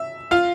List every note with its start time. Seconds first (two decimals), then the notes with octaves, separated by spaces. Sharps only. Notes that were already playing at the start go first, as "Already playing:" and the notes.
Already playing: E5
0.31 F4 F5